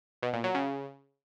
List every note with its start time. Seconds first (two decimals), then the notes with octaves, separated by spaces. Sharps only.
0.23 B2
0.33 A#2
0.44 F#3
0.55 C#3